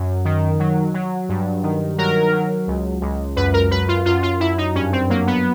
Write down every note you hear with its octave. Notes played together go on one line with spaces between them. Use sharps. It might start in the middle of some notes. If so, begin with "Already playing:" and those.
Already playing: F#2
D#3
F#3
F#3
G2
D#3
F#3 A#4
F#3
C#2
C#2
F#2 B4
A#4
F#2 B4
F4
F#2 F4
F4
F#2 E4
D#4
G2 C#4
C4
F#3 A#3
B3